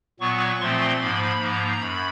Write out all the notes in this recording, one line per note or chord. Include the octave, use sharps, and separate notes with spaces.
A#2 F#3 B3 C#6
A#2 F3 A3 C4 C6
G#2 F3 A#3 B5
G#2 F3 A#3 A#5
F#2 B5